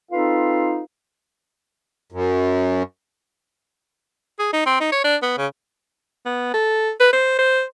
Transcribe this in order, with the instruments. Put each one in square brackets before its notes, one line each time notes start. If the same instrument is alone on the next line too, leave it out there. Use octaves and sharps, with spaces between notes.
[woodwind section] C4 D#4 F4 A4 B4 F5
[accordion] F#2
[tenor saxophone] G#4
D#4
C4
D#4
C#5
D4
B3
C#3
[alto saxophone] B3
A4
B4
C5
C5